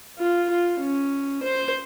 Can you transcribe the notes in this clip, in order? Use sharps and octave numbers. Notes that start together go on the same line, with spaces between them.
F4
F4
C#4
C5